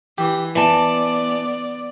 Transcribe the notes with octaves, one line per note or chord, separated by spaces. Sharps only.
E3 G4
E3 B3 D5 G#5 A5